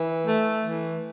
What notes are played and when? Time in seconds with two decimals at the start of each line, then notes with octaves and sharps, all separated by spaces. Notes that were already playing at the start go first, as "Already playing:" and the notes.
Already playing: E3
0.27 A3
0.64 E3